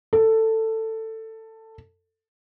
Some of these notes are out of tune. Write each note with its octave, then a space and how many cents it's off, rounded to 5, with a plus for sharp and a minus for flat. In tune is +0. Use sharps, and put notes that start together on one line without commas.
A4 +15